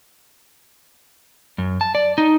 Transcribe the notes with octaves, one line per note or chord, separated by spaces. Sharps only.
F#2
A5
D5
D#4